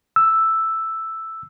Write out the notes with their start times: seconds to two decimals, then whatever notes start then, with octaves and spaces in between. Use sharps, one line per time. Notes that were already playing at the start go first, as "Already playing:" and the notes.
0.16 E6